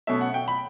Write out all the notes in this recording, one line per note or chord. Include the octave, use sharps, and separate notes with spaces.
B2 F#3 A3 C#4 E5
F#5
G5
B5